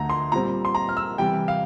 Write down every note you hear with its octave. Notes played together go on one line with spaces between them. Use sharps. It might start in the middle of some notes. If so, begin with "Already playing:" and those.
Already playing: D2 D3 A3 A#5
C6
A#2 G3 C4 A#5
C6
A#5
F6
E6
C3 E3 G3 G5
F5